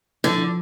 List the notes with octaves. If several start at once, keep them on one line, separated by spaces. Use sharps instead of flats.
D3 F3